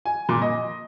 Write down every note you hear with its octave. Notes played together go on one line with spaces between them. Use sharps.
G#5
A#2
D#5